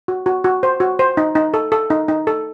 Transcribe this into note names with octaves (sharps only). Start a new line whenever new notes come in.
F#4
F#4
F#4
C5
F#4
C5
D#4
D#4
A4
A4
D#4
D#4
A4